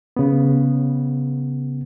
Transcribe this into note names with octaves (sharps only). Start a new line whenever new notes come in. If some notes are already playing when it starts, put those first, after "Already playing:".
C#3 B3